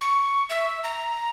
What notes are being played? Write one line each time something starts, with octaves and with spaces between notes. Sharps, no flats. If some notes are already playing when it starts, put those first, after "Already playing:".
C#6
E5
A#5